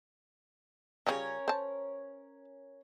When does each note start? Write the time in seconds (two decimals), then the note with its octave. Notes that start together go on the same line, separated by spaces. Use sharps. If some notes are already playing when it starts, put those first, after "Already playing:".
1.07 C#3 G3 C#4 F4 A#4 C#5
1.48 C5 A5